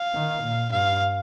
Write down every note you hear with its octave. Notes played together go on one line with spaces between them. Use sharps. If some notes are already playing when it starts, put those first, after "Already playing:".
Already playing: F5
D#3
A#2
G2 F5